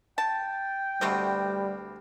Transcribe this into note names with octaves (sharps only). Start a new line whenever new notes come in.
G5 A5
D2 B2 G3 A3 B3 C4 A#5